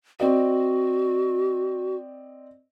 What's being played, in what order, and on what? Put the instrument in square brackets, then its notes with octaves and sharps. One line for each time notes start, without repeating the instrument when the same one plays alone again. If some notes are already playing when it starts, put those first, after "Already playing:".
[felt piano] C4 D5 D#5 [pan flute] F#4